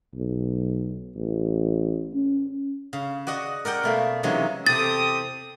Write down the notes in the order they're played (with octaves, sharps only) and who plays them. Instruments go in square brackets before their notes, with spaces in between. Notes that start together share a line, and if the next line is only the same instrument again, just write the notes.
[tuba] B1
A1
C#4
[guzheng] C#3
F#4 D5 D#5 F#5
A#4 D5 F#5 G5
B2 A3 A#3
C3 E3 F#3 G#3 C#4 D#4
[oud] E2 C3 A4 [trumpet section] C4 G4 D#6 [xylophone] A6